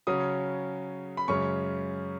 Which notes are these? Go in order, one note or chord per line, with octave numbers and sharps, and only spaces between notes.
C#3 F#3 C#4 D#6
B5
F#2 C#3 G#3 C#4 C#6